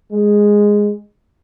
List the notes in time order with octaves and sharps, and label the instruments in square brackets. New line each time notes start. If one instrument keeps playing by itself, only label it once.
[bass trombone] G#3